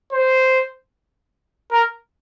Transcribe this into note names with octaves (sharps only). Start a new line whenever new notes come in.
C5
A#4